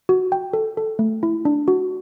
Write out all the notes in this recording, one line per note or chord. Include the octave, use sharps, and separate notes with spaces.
F#4
G5
A4
A4
A3
E4
D4
F#4